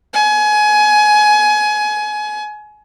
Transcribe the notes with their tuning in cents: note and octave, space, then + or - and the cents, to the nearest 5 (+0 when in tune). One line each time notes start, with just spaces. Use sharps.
G#5 +25